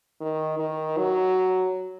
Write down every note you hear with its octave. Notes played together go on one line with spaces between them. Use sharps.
D#3
D#3
F#3